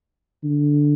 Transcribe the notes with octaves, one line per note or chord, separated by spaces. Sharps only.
D3